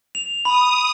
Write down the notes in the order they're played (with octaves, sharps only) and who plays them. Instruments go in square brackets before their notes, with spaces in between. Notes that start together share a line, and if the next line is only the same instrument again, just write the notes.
[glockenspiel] F7
[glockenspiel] B5 [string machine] D#6